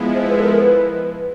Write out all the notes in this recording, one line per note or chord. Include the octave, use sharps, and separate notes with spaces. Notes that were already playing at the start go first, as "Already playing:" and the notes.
Already playing: F3 G#3 B3 E4
C5
B4
A4
A#4
B4